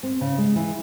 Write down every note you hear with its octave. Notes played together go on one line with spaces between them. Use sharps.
C4
C#3
G#3
E3